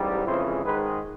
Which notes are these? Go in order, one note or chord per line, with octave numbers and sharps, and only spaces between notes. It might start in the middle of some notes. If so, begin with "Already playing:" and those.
Already playing: A1 G#2 G3
F2 C#3 E3 G#3 C5
G#2 D#3 G#3 B4